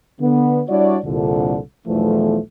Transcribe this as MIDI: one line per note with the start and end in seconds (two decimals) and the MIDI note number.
0.21 0.62 50
0.21 0.62 59
0.69 0.98 55
0.69 0.98 62
0.69 0.98 64
0.69 0.98 66
0.69 0.98 73
0.69 0.98 74
1.04 1.59 36
1.04 1.59 41
1.04 1.59 46
1.04 1.59 50
1.87 2.39 35
1.87 2.39 40
1.87 2.39 52
1.87 2.39 53
1.87 2.39 57